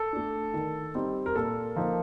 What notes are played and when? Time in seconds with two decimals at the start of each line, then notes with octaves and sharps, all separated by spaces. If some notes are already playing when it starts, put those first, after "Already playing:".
Already playing: A4
0.13 A3 D4
0.54 D#3
0.95 G3 C4 D#4
1.26 A#4
1.35 A#2 A4
1.76 F3 A#3 D#4